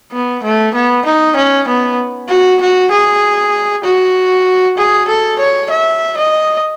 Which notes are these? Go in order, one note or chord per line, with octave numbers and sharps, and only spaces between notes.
B3
A3
B3
D#4
C#4
B3
F#4
F#4
G#4
F#4
G#4
A4
C#5
E5
D#5